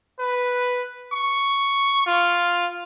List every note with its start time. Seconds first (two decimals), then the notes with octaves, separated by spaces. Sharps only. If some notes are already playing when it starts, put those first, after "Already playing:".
0.19 B4
1.13 C#6
2.06 F4